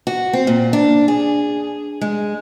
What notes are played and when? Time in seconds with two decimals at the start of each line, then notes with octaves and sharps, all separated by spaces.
0.07 F#4
0.33 C4
0.47 A#2
0.73 D4
1.08 G#4
2.01 G#3